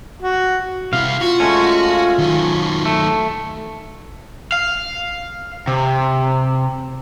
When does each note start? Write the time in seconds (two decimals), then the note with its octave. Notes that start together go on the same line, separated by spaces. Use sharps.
0.22 F#4
0.93 C3 E4 F5
1.21 F4 F#4
1.40 G#3 A3 C#4
2.19 D#3 F#3
2.86 A3
4.52 F5
5.67 C3